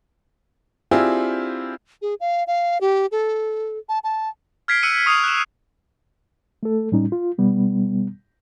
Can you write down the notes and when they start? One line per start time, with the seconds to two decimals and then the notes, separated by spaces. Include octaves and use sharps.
0.91 C4 D4 E4 F4 G4 G#4
2.02 G#4
2.20 F5
2.47 F5
2.81 G4
3.12 A4
3.89 A5
4.04 A5
4.68 F6 G#6 B6 C7 D7
4.83 E6 F#6 C#7 D#7
5.06 C#6 D#6 B6 C7 D#7 F7
5.24 F#6 E7
6.63 A3 A4
6.92 A2 G3 C#4 D#4
7.12 F4
7.38 B2 G3 B3